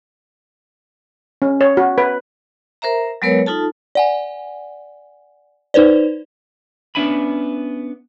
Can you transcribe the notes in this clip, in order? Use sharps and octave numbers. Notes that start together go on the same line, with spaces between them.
C#4
C#5
F#4
B4
A#4 C5 E5 A#5
F#3 G#3 B3 A#4 B4 C#5
D#4 F4 A4 A5
D5 F#5 G#5
D#4 B4 C5 D5
B3 C#4 D4 E5 G#5 B5